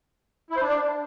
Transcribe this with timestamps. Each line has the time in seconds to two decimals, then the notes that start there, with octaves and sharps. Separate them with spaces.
0.50 E4
0.56 C5
0.62 D4